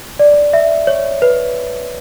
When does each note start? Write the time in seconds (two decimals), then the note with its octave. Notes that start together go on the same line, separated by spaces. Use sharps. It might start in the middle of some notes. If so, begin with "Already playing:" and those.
0.19 D5
0.53 E5
0.87 C#5
1.22 B4